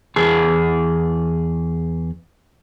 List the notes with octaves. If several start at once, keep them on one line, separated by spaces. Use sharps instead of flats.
E2 G#4 A5